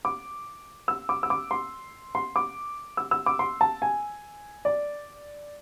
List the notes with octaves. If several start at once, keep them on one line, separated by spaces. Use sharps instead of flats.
D6
E6
D6
E6
D6
C6
C6
D6
E6
E6
D6
C6
A5
G#5
D5